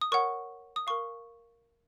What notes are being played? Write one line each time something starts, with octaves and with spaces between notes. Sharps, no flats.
D#6
A#4 C#5 F#5 C#6
D#6
A#4 F5 C#6